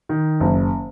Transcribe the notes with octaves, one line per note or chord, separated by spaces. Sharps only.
D#3
F#1